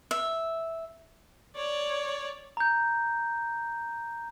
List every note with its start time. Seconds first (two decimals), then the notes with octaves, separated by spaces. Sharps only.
0.11 E5
1.56 C#5 D5
2.57 A#5 G6